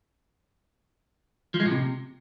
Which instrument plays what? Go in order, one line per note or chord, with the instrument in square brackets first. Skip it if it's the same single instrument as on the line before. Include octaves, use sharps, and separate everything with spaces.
[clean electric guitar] F3
G#3
A2
C3